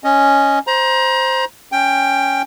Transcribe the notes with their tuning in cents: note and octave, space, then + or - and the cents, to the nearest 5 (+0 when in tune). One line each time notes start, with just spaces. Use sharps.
C#4 +0 D#5 +0
C5 +0 A#5 +30
C#4 +0 G5 +10